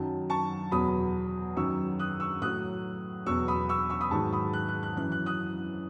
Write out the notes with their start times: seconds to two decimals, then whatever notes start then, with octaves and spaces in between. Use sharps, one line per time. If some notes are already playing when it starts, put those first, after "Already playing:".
Already playing: F#2 D#3 F#3 A5
0.30 A5 C#6
0.71 E2 B2 F#3 B5 D#6
1.57 F#2 D#3 F#3 C#6 E6
1.99 D#6 F#6
2.20 C#6 E6
2.42 A2 F#3 D#6 F#6
3.26 E2 B2 F#3 C#6 E6
3.48 B5 D#6
3.69 C#6 E6
3.90 C#6 E6
4.01 B5 D#6
4.11 G#2 D#3 F#3 A5 C#6
4.33 B5 D#6
4.53 F#6
4.69 F#6
4.83 F#6
4.96 F#2 E3 F#6
5.12 F#6
5.26 D#6 F#6